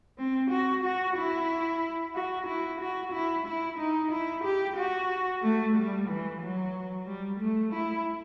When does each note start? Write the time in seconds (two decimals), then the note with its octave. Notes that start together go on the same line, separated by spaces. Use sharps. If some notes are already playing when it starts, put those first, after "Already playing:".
0.18 C4
0.51 F#4
0.84 F#4
1.17 E4
2.15 F#4
2.47 E4
2.81 F#4
3.13 E4
3.47 E4
3.79 D#4
4.12 E4
4.44 G4
4.77 F#4
5.42 A3
5.76 G3
6.09 E3
6.42 F#3
7.06 G3
7.40 A3
7.73 E4